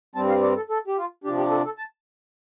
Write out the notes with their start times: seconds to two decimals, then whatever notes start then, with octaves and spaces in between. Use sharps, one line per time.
0.15 G2 G3 C4 A5
0.29 F5
0.43 D5
0.56 A4
0.70 A4
0.87 G4
0.97 F4
1.24 C3 F3 D4 G4
1.38 G4
1.51 A4
1.65 A4
1.78 A5